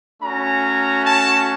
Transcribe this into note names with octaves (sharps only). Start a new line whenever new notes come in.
A3 C#4 F#4 A#5
A5